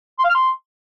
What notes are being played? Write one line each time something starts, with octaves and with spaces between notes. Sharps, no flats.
C6
F5
F6
C6